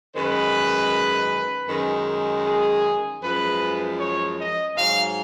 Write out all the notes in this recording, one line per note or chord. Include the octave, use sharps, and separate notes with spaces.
F#2 D#3 G#3 B4
F#2 D#3 G#3
G#4
F#2 F3 G#3 B4
C#5
D#5
G#2 F#3 F5